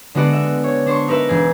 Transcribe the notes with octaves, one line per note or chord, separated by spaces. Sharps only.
D3 G#3 B3 F#4 D5 C#7
E5
C#5
D4 C5 C6 C#6
D#4 A#4 B4 E5
E1 G#4